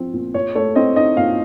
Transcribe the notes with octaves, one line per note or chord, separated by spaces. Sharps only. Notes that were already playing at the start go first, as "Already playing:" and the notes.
Already playing: F3 C4
A#2
A#2 C#5
A3 C#5
C4 D#5
D#4 D#5
A#2 F5